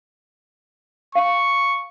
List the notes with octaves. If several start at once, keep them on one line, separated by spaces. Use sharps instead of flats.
F5 C#6